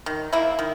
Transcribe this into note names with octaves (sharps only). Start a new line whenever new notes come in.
D#3
A#3 E4
D#3